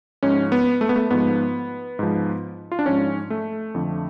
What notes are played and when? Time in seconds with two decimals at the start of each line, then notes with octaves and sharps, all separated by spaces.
0.23 G#2 F3 C#4
0.52 B3
0.81 A3
0.89 B3
0.96 A3
1.10 G#2 F3 B3
1.99 G#2 F3
2.72 F4
2.79 D4
2.86 G#2 F3 C#4
3.30 A3
3.75 F2 D3 F3